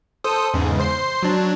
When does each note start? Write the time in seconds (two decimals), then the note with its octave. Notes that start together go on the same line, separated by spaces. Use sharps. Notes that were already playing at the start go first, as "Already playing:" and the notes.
0.24 A4 C5 D#6
0.54 E2 G#2 C#3
0.80 C5 C7
1.22 F#3 D4